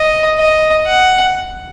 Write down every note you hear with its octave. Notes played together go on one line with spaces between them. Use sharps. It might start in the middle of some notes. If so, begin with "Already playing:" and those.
Already playing: D#5
D#5
F#5